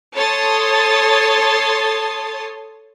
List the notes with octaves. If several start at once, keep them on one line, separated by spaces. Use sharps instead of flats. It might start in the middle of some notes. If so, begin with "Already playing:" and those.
A4 C#5 A5 C6 D#6 A6